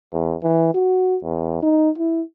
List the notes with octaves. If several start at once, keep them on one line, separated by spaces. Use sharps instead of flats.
E2
E3
F#4
E2
D#4
E4